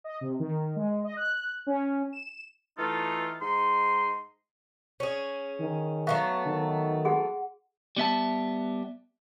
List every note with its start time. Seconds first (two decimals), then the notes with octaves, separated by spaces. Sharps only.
0.04 D#5
0.21 C3
0.40 D#3
0.76 G#3
1.04 D#5
1.17 F#6
1.67 C#4
2.13 E7
2.79 E3 A3 D#4 F4 A4
3.42 G#2 D#4 C6
5.00 C#4 G#4
5.60 D#3
6.07 F#3 A3 B3 E5 F5 C#6
6.47 D#3
7.05 F#4 G#4 F#5
7.97 G3 B3 E5 A5